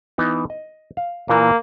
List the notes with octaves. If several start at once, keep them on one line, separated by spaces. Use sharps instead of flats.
E3 B3 D#4
D#5
F5
A#2 E3 A#3 A5